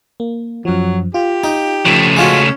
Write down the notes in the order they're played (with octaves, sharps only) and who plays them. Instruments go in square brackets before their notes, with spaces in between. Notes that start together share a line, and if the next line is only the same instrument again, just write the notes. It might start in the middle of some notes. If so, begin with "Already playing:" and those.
[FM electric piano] A#3
[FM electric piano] F#2 F3 [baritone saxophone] F#3
[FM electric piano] F4 [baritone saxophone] G4
[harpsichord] D#4
[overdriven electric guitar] C#3 A3 [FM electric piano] F3
[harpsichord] G#3 F4 F#4 [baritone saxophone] C#4